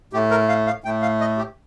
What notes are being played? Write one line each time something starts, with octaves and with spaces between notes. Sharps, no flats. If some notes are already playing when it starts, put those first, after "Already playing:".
A2 A3 G4
A#4
F5
F5
A2 A3 G5
F5
D#5
G4